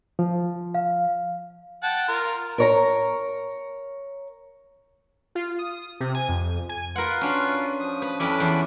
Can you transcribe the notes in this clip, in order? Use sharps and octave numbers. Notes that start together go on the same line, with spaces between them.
F3
F5
F#5 G5 A5
F4 A#4
A#4 C#5 A#5
F4
D#6
C3
G#5
F2
G#5
F4 A#4 B4 F#5 C6
C#4 D4 F#4
F3 D#6
B4
F2 C#4 D4 E4 B5 D6
E2